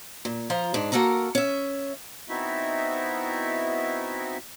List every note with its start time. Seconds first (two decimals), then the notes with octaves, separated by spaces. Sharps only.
0.25 A#2
0.50 F3 F4 A#5
0.74 G#2 D4
0.92 A#3 F#4 A4 A#4 A#5
1.35 C#4 E5
2.29 B3 C4 D#4 E4 F#4 E5